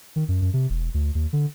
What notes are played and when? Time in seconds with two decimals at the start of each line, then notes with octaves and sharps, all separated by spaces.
0.16 D#3
0.28 F#2
0.41 F#2
0.53 C3
0.70 E1
0.94 D2
1.15 D#2
1.33 D3